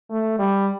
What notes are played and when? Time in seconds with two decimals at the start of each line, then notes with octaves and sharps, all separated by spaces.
0.11 A3
0.39 G3